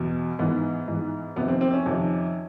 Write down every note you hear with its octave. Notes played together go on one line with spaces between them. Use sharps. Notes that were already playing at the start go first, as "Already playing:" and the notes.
Already playing: E2 B2
G#2 E3 B3
G#2 E3
F2 C3 D#3 B3
C4
C4
C#4
F2 C3 D#3